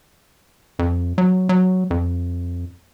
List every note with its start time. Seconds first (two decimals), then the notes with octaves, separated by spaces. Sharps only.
0.79 F2
1.18 F#3
1.49 F#3
1.90 F2